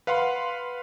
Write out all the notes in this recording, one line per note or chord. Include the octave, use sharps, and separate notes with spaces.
B4 F5 F#5 B5 C6